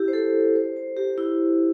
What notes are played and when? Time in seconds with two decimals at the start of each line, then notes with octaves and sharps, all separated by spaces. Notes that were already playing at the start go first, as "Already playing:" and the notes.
Already playing: E4 G4
0.08 C5
0.13 A4
0.55 C5
0.77 C5
0.97 G4
1.18 E4